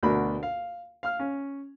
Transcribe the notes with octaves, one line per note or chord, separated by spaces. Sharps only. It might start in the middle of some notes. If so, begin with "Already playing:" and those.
D2 B2 D4 A#4 B5
F5
F5 F6
C#4